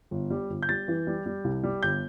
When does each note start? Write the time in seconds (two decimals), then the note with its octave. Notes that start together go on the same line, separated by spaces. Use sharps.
0.11 G1
0.30 G3
0.50 G1
0.62 G6
0.69 G3 A6
0.88 E3
1.07 G3
1.26 G3
1.44 C2
1.64 G3
1.83 G1 G6